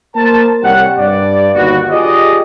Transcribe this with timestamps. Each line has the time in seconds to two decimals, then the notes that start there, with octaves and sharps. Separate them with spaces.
0.15 A#3 A#4 C5 A5
0.63 C2 G3 C#5 F#5
0.98 G2 D5
1.55 G1 D#2 B3 F#4
1.90 F4 G4 G#4 D5 D#5